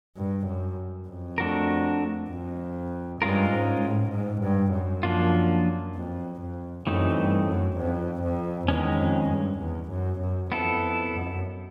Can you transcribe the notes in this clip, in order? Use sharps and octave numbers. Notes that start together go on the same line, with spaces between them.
G2
F#2
F2
A3 D4 F#4 A#4
F2
G2 G#3 C#4 F4 A#4
G#2
A2
G#2
G2
F#2
F3 A#3 D4 F4
F2
F2
F#2 E3 A3 C4 D#4
G2
F#2
F2
F2
E2 D#3 G#3 C#4
F2
G2
E2
F#2
F#2
F2 B3 E4 A4
F2
F#2